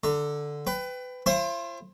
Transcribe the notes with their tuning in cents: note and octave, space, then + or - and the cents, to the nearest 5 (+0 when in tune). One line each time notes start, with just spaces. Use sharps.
D3 +0 A#5 -35
B4 +25 G5 +0
F4 -45 C5 +30 G5 +30